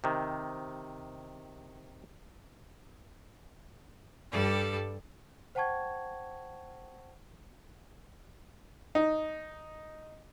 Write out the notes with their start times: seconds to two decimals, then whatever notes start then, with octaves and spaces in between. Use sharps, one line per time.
0.04 C3 D#3
4.30 G2 G3 A4 D5
5.55 C5 F#5 G5 A5 C#6 G#6
8.95 D#4